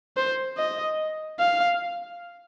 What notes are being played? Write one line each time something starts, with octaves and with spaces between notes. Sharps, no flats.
C5
D#5
F5